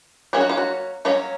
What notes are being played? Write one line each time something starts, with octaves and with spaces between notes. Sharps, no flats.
F#3 A#3 C#4 G#4
F#4
F4
F#4
F#3 A#3 C#4 F4